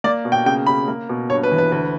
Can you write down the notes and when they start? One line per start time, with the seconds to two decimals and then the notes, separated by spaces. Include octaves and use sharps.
0.04 A#3 D5
0.25 B2
0.32 G5
0.46 C#3 G5
0.67 C#3 B5
0.88 A#3
1.09 B2
1.30 G2 C#5
1.43 B4
1.51 E3
1.58 B4
1.72 D2 B4